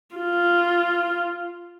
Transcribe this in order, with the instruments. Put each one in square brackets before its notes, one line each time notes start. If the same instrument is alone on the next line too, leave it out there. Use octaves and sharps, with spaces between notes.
[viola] F4